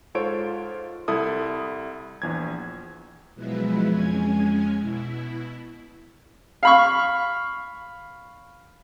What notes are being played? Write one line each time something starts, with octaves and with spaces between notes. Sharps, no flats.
G#2 F4 A4 C5 C#5 D7
C2 E4 A4 D#6
A#1 E2 G#6
B2 F3 F#3 G#3 E4 B4
F2 G#3 C#4 G#5 G#6
B2 E4
F5 B5 C#6